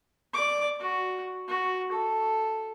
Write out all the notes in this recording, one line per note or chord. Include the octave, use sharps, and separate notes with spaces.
D5 D6
F#4
F#4
A4